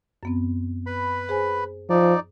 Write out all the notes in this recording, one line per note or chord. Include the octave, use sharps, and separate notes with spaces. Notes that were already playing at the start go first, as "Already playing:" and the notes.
F#2 B3 C4
B4 B5
G#4 C5 G#5
F3 D#4 D5